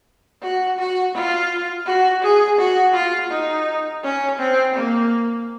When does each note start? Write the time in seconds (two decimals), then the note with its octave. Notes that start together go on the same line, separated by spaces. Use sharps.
0.42 F#4
0.79 F#4
1.15 F4
1.86 F#4
2.23 G#4
2.58 F#4
2.94 F4
3.31 D#4
4.03 C#4
4.39 C4
4.75 A#3